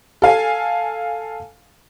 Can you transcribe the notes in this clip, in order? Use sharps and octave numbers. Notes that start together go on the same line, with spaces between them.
A4 F5 G#5